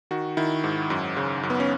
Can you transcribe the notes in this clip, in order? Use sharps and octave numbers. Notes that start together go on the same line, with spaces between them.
D#3 F#4
D#3 E4
G#2
F#2
C#3
F#2
B3
C#4